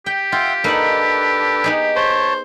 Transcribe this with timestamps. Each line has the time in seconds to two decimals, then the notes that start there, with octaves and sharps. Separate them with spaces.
0.06 G4 G5
0.32 F4 E5 F#5 G5 C6
0.64 A#3 D4 D#4 A4 B4 F#5
1.64 B3 D#4 G#4
1.96 C5 C#5 A5